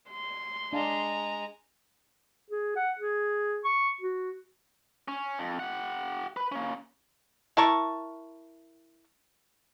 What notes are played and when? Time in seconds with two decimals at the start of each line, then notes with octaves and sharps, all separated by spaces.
0.10 C6
0.73 G#3 D4 F5 A5 A#5
2.50 G#4
2.76 F#5
2.99 G#4
3.65 C#6
4.01 F#4
5.08 C#4
5.39 F2
5.59 G4 F#5
6.37 B4 B5
6.52 A#3 C#4
7.57 E4 A#4 A5 C#6